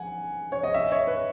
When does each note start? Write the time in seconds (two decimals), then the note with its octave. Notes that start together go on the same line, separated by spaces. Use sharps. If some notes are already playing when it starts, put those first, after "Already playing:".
Already playing: F#5 G#5
0.52 C#5
0.63 D#5
0.74 E5
0.92 C#5
1.07 B4